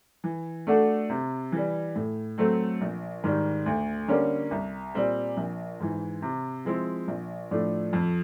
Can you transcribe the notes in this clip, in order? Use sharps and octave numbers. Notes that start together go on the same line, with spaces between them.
E3
A3 D4 F#4 A4
C3
E3 G3
A2
F#3 A3 C4
A#1
G#2 D#3 G3
D2
D3 G3 A#3 C#4
C2
A#2 G3 C4
A#1
G#2 E3
C3
F3 G#3 C4 E4
A#1
A2 F3 A3 D4
F2